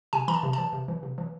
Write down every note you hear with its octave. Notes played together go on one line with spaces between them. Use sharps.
C3 G#5
E3 A#5
A5
C3
E3 A5
C3
E3
C3
E3